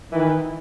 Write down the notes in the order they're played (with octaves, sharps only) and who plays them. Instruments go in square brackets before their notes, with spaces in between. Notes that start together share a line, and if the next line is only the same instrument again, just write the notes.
[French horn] D#3 [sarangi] E3